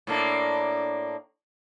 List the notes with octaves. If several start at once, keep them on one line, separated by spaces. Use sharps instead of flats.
A2 A#3 D4